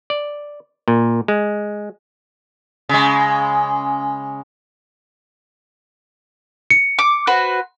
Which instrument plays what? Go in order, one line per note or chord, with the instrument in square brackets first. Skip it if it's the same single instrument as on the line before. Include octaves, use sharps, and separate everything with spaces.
[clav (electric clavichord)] D5
A#2
G#3
[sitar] C#3 G#3
[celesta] C#7
[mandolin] D6
F#4 B4 C5